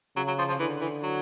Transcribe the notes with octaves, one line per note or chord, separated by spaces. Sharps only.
C#3 F#3
F#3
F3
F3
D3 E3
E3
F#3